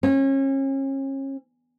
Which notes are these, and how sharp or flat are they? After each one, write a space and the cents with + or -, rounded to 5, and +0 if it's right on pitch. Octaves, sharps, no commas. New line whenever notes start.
C#4 -35